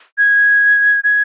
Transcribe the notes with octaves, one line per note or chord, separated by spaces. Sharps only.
G#6
G#6